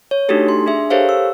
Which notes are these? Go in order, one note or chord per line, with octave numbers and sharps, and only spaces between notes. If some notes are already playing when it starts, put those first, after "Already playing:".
C#5
A3 D4 D#4 F#4 G4 A4
C6
D4 G#4 E5
G4 A4 A#4 C5 C#5 F5
E6